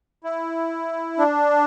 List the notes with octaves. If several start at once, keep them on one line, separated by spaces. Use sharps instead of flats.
E4
D4